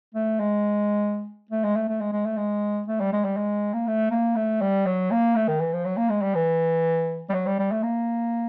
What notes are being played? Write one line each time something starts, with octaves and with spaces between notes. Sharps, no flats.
A3
G#3
A3
G#3
A3
A3
G#3
G#3
A3
G#3
A3
G3
G#3
G3
G#3
A#3
A3
A#3
A3
G3
F#3
A#3
A3
D#3
E3
F3
F#3
A#3
G#3
G3
E3
G3
F#3
G3
G3
A3
A#3